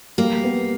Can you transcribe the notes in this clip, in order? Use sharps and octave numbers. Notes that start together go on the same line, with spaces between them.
G3 A#3
B3